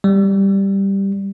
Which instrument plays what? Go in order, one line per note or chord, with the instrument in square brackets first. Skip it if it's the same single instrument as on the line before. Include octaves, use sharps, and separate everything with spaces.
[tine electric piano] G3